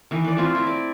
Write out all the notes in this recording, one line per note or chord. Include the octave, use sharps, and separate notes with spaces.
D#3 E3
B4 D5
A3 C4 F4
E4
D5